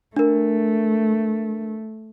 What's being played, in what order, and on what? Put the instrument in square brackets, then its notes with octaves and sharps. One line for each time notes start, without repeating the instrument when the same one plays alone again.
[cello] A3 [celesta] D4 A#4